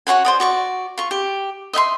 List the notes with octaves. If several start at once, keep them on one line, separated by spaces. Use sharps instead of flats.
F#4 C#5 F#5 G#5
C5 D5 D#6
F#4 D5 C#6
F4 C#6
G4
D#5 E5 G5 C6